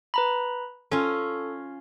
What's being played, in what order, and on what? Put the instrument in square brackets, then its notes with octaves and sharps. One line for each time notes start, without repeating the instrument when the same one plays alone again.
[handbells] B4 A#5 B5
[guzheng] C#4 F4 [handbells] A4